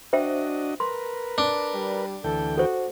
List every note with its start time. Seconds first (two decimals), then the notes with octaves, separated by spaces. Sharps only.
0.13 D4 F#4 C5 D#5 E5 G5
0.80 A#4 B4 C6
1.38 D4
1.74 G3
2.24 D2 E3 A4 G5
2.58 F#4 A4 C5